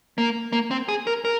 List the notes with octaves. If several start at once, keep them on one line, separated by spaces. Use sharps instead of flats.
A#3
A#3
C4
G#4
A#4
A#4